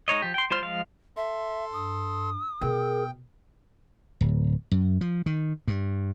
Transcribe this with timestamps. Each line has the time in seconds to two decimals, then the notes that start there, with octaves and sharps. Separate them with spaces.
0.08 G#3 D#4 C#5 D#5
0.22 F3 G4
0.34 G5 C6
0.51 G3 F4 C5 C6 F6
0.62 F3 G#3 F5
1.17 A4 E5 C6
1.73 G2 D#6
2.61 B2 G#4 A#4 G5
4.21 D1
4.71 F#2
5.01 F3
5.26 D#3
5.68 G2